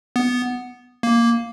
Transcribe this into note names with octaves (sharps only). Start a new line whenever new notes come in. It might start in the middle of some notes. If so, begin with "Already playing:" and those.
B3
A#3